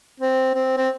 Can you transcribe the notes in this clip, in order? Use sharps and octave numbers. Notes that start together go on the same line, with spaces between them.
C4
C4
C4